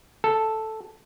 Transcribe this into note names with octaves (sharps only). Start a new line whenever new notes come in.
A4